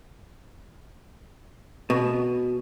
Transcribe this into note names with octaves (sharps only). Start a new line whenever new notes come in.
B2